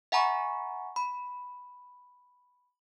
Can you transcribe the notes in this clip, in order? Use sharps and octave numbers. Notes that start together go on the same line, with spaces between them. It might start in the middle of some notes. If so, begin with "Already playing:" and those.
E5 F#5 G#5 A#5 B5 C#6
B5